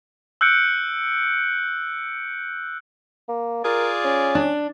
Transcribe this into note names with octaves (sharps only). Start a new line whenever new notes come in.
E6 F#6 G6 C#7 D7
A#3
F4 G#4 A#4 D5
C#4
D4